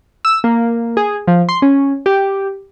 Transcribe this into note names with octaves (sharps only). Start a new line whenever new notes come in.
E6
A#3
G#4
F3
C6
C#4
G4